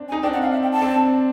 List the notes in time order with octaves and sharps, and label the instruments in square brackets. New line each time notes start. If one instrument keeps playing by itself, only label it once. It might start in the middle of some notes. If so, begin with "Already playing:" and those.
Already playing: [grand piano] C4 D4
[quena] G#5
[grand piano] D#4
[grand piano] C4 D4 [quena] G5
[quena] F#5
F5
E5
G5
A5
[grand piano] C4 D4